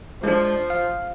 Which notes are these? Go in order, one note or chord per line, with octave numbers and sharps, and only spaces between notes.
F3 G#3 D4
F5